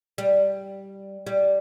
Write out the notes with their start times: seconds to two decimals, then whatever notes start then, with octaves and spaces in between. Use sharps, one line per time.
0.18 G3
1.27 G3